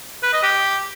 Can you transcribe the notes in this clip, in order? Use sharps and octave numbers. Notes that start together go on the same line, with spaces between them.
B4
D#5
G4